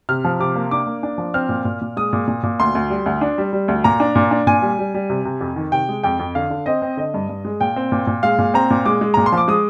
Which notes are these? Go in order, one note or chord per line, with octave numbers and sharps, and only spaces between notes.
C3 F6
F3
C3 D6
A#3
D4 D6
A#3
D4
F3
C4 F6
A#2
A#2
A#2
G#3 D#6
A#2
A#2
A#2
D2 C6
D2
G3
D2
D4
G3
G3
D2
A#2 A#5
D4
A#2
D4
A#2 G#5
G3
G3
G3
C3
C3
F2
D#3
C3 G5
G#3
F2 G5
F2
D3 F5
D3
C4 D#5
C4
D3 D#5
G2
G2
G#3
A#2 G5
C4
A#2
A#2
G#3 F5
A#2
C4 A#5
A#2
G#3 D6
G#3
A#2 A#5
C6
F3
D6
G#3 D#6